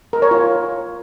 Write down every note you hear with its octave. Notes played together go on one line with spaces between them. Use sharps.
A#4
C#5
F4